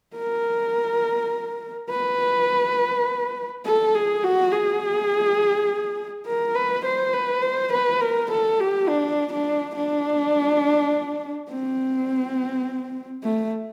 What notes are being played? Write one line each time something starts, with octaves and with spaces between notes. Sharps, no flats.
A#4
B4
A4
G#4
F#4
G#4
A#4
B4
C5
B4
C5
B4
A#4
A4
G4
D4
D4
D4
C4
A3